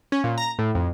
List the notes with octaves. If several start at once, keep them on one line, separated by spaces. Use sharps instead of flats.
C#4
A#2
A#5
A2
F2